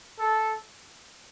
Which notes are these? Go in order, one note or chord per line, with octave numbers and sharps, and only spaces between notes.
A4